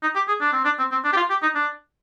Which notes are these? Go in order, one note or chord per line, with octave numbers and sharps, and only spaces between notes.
D#4
G4
G#4
D4
C4
D4
C4
C4
D4
G4
F4
G4
D#4
D4